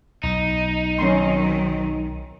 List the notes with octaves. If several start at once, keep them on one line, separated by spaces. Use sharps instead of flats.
B1 D#4
D#3 F#3 C4 C#4 C6